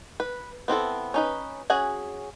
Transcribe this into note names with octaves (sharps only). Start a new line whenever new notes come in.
B4
B3 C4 E4 A4
C#4 D#4 B4
C#4 F#4 G#4 F#5 G#5